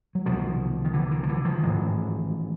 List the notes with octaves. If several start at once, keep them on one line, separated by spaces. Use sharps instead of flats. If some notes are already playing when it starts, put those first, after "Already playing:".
F#3
C2 B2 D#3 F3
D#3
D3 E3
D#3
F3
D3 E3
D#3 F3
A1 G#2